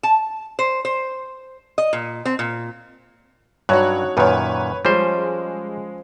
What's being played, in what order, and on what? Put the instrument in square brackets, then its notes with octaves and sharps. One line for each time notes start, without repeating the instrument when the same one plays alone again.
[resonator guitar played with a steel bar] A5
C5
C5
D#5
A#2
C4
A#2
[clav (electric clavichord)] G2 F#3 [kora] C#4 D#4 F#4 [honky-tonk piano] C#5 F#6
[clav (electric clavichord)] F#2 A#2 D#3 [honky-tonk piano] B4 C#5
[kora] F3 C#4 [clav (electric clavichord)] G3 C5 [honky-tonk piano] G#3